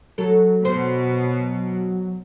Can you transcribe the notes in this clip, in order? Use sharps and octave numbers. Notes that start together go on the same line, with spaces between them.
F#3 A4
B2 C5